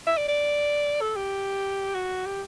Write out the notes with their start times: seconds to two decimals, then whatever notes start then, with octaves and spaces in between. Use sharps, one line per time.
0.06 E5
0.17 D5
0.28 D5
1.01 A4
1.16 G4
1.94 F#4
2.26 G4